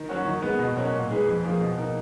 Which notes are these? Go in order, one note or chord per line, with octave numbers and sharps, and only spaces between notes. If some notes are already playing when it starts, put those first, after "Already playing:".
Already playing: D#3
F#3 C#4 F#4
D#3
G#3 B3
B2
F#3 A#3 C#4 F#4
A#2
G#3 D#4 G#4 B4
F2
F3 A#3 D#4 G#4
B2
A#3 D#4